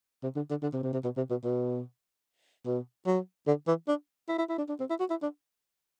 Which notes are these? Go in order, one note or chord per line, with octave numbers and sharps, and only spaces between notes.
C3
D3
D3
D3
C3
C3
C3
B2
C3
B2
B2
B2
F#3
D3
E3
D4
E4
E4
E4
D4
D4
C4
E4
F#4
E4
D4